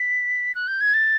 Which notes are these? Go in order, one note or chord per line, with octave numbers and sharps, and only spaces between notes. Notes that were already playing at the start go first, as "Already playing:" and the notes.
Already playing: B6
F#6
G6
G#6
A6